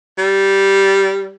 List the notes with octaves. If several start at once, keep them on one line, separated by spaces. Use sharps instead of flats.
G3